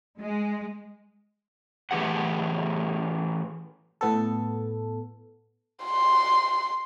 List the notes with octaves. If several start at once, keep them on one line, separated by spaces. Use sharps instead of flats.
G#3
A2 E3 G4 G#4 F#5
A2 B3 A4
C6